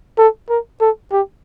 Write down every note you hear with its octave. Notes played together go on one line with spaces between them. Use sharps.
A4
A#4
A4
G4